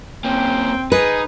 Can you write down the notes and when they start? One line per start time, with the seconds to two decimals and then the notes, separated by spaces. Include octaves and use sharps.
0.24 A#3 C4 C#4 G5
0.92 D#4 G#4 B4